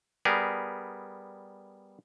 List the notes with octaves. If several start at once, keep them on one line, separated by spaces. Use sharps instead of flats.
G3 B3 G#4 A#4